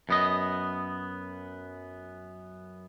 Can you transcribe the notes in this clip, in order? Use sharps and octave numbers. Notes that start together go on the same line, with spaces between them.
F#2 B3 D#5